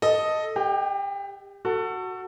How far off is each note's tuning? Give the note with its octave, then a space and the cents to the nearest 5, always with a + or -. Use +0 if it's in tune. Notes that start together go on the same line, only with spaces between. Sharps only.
A4 +0 D#5 +0
G4 +30 G5 -25
F#4 +0 A4 +25